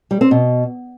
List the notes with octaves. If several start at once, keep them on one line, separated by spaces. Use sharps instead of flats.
G3
C4
B2